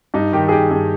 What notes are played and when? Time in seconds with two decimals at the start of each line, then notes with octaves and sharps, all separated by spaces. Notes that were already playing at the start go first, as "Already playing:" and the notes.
0.14 G2 D#4
0.33 D#3 G4
0.48 G#4
0.52 D#3 G4
0.71 G2 G#4